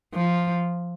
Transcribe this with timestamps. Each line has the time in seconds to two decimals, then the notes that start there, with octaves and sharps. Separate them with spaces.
0.14 F3